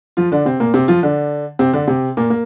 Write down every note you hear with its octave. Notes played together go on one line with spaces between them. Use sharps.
F3 F4
D3 D4
C3 C4
A#2 A#3
C3 C4
F3 F4
D3 D4
C3 C4
D3 D4
C3 C4
A#2 A#3
A#3